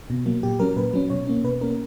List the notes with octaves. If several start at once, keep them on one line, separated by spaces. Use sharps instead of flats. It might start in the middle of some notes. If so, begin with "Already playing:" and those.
B2
F#3 A#3
A#2 G4
F#3 C#4 A#4
A#2 B4
F#3 C#4
B2 C#5
A#3 C#4
B2 B4
A#3 C#4 A#4